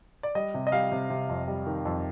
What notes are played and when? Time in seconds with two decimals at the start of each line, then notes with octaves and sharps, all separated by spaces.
0.23 D5
0.35 G3 D#5
0.54 C3
0.67 D#5
0.72 G3 F5
0.91 C3
1.10 C3
1.29 F2
1.48 G3
1.67 D#3
1.85 F2